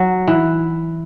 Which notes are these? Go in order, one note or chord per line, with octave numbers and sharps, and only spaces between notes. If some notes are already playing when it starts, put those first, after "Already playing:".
Already playing: F#3
E3